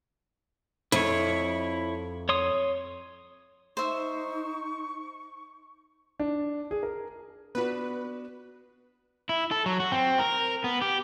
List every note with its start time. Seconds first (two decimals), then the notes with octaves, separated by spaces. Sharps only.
0.92 F2 E4 C#5
2.29 C#5 C6 D#6
3.77 D#4 C5 E5 C#6
6.20 D4
6.71 G#4
6.83 A#4
7.55 B3 D4 F#4 B4
9.29 E4
9.51 A4
9.66 F#3
9.80 F#4
9.92 C4
10.19 A#4
10.64 B3
10.82 G4